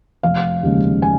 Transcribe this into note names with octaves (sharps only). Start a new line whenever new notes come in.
F1 F5
D#2 C#3 G#3
G#5